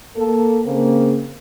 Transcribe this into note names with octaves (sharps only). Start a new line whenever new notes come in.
A#3 A4
C#3 A#3 C4